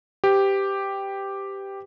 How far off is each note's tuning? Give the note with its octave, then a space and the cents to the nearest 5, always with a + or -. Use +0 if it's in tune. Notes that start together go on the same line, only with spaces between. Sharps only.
G4 +0 B4 +45